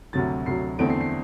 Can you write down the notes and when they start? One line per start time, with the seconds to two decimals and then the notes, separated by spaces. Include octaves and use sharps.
0.13 D2 C3 F#3 A6
0.46 D2 C3 F#3 C7
0.79 E2 D3 A3 C4 D7
0.90 C7
1.01 C7